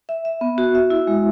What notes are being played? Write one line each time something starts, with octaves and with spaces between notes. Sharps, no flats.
E5
E5
B3
F#4
E5
E4
G#3